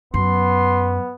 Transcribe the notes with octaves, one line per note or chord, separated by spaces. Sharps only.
F#2 B3 C6